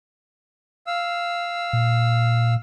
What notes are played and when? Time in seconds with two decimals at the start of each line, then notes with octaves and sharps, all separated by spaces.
0.87 F5 E6
1.73 A#2